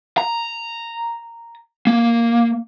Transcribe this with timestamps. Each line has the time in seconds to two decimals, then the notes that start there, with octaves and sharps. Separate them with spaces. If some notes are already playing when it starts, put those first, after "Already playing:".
0.18 A#5
1.87 A#3